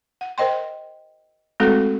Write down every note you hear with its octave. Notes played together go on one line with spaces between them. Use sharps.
F#5
A#4 C5 D#5 G5 C6
G#3 A3 C4 F#4 A4